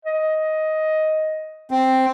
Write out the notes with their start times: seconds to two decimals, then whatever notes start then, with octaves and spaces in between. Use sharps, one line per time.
0.05 D#5
1.71 C4